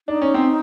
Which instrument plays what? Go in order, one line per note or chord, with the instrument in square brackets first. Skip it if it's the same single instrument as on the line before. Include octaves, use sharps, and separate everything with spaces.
[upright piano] D4 [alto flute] D#4
[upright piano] C#4
C4